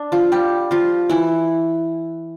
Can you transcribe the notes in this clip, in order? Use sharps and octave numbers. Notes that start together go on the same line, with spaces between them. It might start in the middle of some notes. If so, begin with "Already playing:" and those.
Already playing: D4
F3 F4
G3 G4
F3 F4
E3 E4